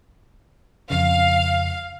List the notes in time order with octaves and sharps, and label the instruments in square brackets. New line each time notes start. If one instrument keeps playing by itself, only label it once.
[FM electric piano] F2 C#3 [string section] F5